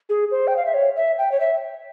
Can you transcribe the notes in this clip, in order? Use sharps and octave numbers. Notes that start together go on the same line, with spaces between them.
G#4
C5
G5
F5
E5
C#5
E5
G5
C#5
E5